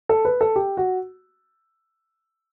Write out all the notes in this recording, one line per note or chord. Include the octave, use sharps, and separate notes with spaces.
A4
B4
A4
G4
F#4